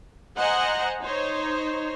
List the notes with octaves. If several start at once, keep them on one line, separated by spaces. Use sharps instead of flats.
C5 D#5 F#5 G#5 A#5
D#4 C5 C#5